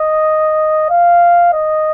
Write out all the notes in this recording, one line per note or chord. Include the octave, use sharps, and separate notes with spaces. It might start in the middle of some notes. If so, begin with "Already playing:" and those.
Already playing: D#5
F5
D#5